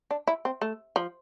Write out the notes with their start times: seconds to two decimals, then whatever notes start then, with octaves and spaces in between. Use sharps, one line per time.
0.11 D4
0.27 E4
0.45 C4
0.61 A3
0.96 F3